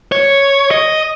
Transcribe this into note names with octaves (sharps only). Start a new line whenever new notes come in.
C#5
D#5